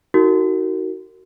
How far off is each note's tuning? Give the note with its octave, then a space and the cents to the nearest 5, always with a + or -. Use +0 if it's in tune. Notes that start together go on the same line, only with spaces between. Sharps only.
D#4 +40 F#4 +20 A#4 -25